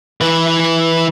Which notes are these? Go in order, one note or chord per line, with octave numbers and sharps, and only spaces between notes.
E3 B4